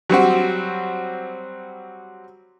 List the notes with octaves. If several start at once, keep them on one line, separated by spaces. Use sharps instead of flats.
F#3 G3 C4 F#4